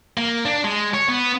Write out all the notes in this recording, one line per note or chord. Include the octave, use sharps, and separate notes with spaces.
A#3
D4
G#3
C#5
B3